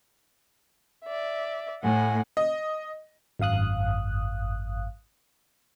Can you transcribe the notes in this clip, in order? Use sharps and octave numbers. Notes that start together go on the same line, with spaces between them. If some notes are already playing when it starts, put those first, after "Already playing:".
D5 E5
A2 F#5 G#5
D#5
G#1 F#2 F5 D#6 F#6